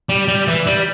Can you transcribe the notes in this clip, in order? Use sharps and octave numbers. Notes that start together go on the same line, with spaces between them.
G3
G3
E3
G3